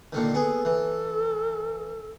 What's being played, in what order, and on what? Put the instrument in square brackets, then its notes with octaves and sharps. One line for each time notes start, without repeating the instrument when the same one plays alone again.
[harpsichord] A#2 D3 D#3
[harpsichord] B3 G#4 [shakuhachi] A4
[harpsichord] E3